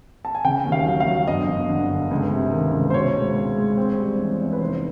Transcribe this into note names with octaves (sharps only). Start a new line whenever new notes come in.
A5
G#5
C#3 G5
D#2
F5
F#3
F5
F#3
G1 D#5
G1
D3
G1
C#2
C3
D#3
C#2
C5
B2 C#5
G#3
C4
G#3
C4
G3
E2
E2
B4
F1 C5